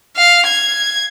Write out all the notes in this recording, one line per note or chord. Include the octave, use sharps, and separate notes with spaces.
F5
G#6